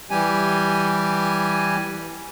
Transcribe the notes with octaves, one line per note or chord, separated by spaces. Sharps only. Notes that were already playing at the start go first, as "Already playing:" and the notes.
E3 G3 G4 G#5